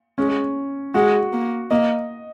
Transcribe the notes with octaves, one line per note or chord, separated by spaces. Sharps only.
G#3 C#4
G#3 F#4
A#3
A#3 D#5